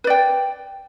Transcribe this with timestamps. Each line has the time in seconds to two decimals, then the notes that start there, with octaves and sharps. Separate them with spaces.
0.04 B4
0.07 D5
0.10 G5